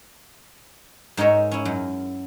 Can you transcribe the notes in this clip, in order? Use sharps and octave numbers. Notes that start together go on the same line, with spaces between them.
G#2 D#4 A#4 C#5 E5
C#4 E4
F#2